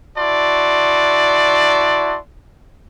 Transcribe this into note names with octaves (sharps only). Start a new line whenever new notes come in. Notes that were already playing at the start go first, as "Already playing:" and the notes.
E4 F#4 D5 A5 C6